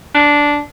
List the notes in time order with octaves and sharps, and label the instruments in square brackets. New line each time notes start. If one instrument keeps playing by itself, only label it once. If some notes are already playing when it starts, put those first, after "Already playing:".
[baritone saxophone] D4